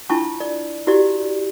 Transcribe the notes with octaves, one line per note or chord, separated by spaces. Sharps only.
D4 E4 F4 A5 C#6
D5
E4 F#4 G4 D5